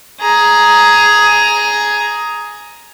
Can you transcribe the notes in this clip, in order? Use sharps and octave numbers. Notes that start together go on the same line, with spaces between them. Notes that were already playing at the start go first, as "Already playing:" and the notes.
G#4 A#5